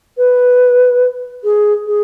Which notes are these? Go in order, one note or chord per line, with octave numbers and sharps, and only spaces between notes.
B4
G#4
G#4